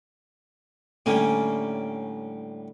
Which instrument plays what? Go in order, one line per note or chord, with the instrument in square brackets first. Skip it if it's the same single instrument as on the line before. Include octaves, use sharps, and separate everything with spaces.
[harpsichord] A2 D3 G3 [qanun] A#3 C#4 G#5